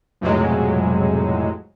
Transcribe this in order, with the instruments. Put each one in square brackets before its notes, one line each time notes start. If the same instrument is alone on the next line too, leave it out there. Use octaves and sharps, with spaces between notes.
[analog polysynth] B1 F2 A2 C3 F#3 G#3